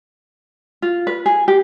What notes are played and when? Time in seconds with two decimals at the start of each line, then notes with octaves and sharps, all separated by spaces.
0.82 F4
1.07 B4
1.26 G#4
1.48 G4